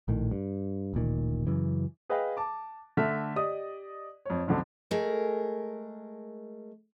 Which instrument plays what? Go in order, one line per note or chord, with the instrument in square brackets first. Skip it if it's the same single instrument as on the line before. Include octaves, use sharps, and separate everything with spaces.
[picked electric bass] A#1 A2 D#3
G2
D1 A1 A#2 D#3
F#2 C#3 E3
[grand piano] G#4 B4 D#5 F5 G5
A5 D6
D3 A3 E5 F6 B6
G4 D5 D#5 D#6
F2 C#5
B1 F2 D3
[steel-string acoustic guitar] G#3 A3 G#4 A#4